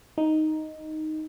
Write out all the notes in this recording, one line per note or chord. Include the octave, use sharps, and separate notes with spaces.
D#4